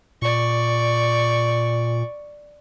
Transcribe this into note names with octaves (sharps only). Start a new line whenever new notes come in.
A#2 D5 C#6